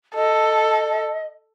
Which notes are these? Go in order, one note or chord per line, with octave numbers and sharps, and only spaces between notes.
A4 D#5